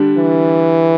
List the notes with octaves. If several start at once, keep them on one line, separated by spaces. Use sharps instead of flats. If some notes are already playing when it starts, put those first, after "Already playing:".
Already playing: D3 G3 D4
E3